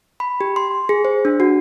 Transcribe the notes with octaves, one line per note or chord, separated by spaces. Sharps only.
B5
G4
C6
G#4
C5
D4
F#4